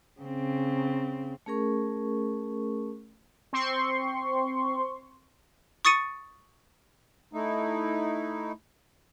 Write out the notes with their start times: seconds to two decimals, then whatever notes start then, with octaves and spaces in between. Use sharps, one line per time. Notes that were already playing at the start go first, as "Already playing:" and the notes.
0.21 C#3 C4
1.46 A3 C#4 G#4 A#4 C#6
3.53 C4 C6 C#6
5.85 C#6 D#6 A6 C#7 D#7
7.33 A3 D#4 E4